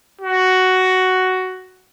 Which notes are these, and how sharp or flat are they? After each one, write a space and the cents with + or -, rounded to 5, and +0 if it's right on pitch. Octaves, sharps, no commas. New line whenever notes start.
F#4 +5